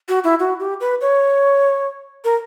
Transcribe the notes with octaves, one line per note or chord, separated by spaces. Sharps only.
F#4
E4
F#4
G4
B4
C#5
A#4